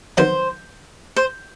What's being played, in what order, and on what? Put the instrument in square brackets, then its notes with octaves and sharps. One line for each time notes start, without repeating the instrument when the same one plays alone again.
[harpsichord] D#3 F#3 B3 [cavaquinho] C5
[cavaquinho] C5